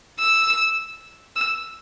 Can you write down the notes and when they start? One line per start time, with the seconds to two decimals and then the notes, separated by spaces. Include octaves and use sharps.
0.19 E6
1.36 E6